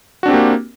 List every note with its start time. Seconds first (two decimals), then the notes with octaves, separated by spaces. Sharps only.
0.23 F#4
0.26 D4
0.28 C4
0.31 G4
0.33 A#3